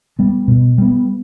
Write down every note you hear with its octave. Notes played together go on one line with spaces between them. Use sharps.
G3 B3
B2
G3 B3